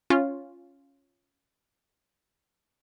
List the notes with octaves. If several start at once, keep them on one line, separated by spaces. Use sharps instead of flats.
C#4 F4